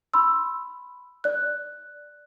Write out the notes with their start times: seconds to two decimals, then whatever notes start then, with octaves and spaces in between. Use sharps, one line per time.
0.14 B5 C6 E6
1.24 D5 F#6